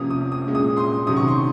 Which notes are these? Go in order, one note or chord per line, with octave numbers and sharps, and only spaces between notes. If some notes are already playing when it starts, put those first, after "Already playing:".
Already playing: C3 F3 A#3 C#4 D#6
D#6
D#6
A#2 G#3 C#4
D#6
C6 D#6
C3 D#3 F#3 C#4 D#6
C#6
C6